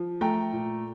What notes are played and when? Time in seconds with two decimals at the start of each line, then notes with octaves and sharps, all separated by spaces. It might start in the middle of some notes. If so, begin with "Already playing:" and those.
Already playing: F3
0.21 A3 G5 A#5
0.53 A#2